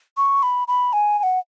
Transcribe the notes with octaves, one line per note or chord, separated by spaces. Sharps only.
C#6
B5
B5
G#5
G#5
F#5